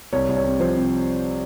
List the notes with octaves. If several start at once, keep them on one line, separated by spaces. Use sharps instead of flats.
C2 C#5
C2
C#5
C3
F3 C5
C3